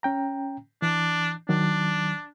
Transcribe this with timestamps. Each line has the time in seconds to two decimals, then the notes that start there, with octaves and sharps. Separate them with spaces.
0.03 C#4 G5 A#5
0.82 E3 D4
1.49 D#3 F#3 D4